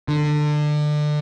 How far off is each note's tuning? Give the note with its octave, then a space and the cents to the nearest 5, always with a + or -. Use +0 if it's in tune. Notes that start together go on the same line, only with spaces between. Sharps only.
D3 +25